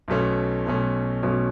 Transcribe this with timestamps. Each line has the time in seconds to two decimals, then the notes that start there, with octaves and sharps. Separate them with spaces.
0.08 B1 B2 A3 C#4
0.66 B1 B2 A3 C#4
1.23 B1 B2 A3 C#4